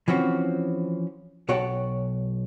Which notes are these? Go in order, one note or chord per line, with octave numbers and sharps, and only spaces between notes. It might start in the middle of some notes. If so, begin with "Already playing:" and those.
E3 F3 C4 C#4 F#4
B1 F#4 C#5 F#5 G5 A5